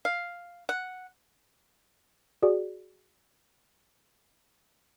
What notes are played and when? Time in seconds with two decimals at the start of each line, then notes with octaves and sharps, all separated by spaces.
0.05 F5
0.69 F#5
2.43 F#4 G#4 D5